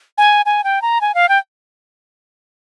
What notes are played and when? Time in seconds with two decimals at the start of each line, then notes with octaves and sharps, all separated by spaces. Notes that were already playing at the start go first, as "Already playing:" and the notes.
0.18 G#5
0.46 G#5
0.64 G5
0.82 A#5
1.01 G#5
1.15 F5
1.29 G5